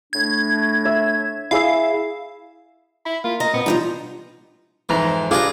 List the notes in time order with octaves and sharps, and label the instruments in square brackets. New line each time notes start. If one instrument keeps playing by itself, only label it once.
[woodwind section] A2 A3 D4 [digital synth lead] G#6
[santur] E5
[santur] E4 G#4 E5 [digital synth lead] F5
[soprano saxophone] E4 [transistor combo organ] B5
[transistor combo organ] A#3 F5 [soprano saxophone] F4
[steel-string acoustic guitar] D#5 [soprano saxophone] A#5
[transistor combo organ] A#2 C4 [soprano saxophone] B3
[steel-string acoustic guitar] B2 D#4 A#5 [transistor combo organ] E3 G3 D4 [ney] F4
[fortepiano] F2 G#2 A#5 [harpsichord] E3
[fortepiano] D4 F4 G#4 [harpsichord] G4 B4 A#5